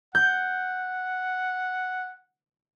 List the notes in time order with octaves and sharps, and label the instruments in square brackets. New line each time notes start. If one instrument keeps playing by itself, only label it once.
[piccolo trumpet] F#5 [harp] G6